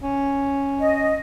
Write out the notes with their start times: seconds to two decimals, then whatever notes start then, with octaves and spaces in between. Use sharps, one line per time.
0.02 C#4
0.79 D#5